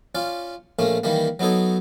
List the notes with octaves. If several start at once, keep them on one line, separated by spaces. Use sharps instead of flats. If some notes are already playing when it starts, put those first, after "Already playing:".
C#4 F4 D5
A#1 A3 A#3 C#4
D#3 E3 G3 A#3
F#3 B3 D#4 A4 C#5